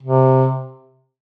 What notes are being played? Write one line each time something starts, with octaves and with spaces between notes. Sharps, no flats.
C3